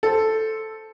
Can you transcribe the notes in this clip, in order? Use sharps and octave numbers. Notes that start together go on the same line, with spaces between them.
A4 C5